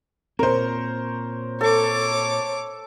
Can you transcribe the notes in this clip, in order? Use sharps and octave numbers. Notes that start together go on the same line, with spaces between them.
A#2 C4 A#4 C5 C#5
A4 C#5 D6